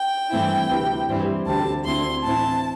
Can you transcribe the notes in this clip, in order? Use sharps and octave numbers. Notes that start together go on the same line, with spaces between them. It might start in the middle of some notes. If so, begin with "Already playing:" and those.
Already playing: G5
G2 E3 A3 C4 E4
D2 C3 E3
G2 E3 G3 C4 E4
D2 D3 G3 C4 A5
D2 D3 C4 E4 C6
A2 E3 C4 E4 A5